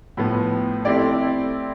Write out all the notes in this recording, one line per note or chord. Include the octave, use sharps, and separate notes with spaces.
A2 F3 B3
A3 C4 E4 G4 D5